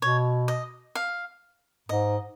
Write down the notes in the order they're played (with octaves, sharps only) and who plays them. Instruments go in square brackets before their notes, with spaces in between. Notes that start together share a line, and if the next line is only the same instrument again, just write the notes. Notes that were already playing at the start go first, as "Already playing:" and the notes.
[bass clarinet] B2 [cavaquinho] C#5
[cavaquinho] D#5
F5
[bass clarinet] G#2 [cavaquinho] D#5